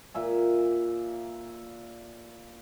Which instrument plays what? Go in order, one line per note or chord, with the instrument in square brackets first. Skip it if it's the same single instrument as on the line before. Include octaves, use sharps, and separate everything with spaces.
[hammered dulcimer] A#2 E5 G#5